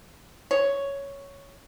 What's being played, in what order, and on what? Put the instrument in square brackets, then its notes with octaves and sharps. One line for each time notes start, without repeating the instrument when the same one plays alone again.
[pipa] C#5